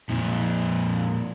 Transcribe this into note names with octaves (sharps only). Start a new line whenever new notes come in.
F2 A#2